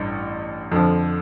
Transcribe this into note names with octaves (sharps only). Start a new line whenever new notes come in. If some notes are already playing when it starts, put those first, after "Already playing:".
Already playing: A1 G2
F2 D3 F3